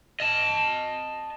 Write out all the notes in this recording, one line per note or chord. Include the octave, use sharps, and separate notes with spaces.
D#5 A5